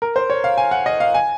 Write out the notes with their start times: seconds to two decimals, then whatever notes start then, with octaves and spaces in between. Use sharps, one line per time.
0.02 A#4
0.16 C5
0.30 C#5
0.44 F5
0.58 G#5
0.71 F#5
0.86 D#5
1.00 F5
1.14 G#5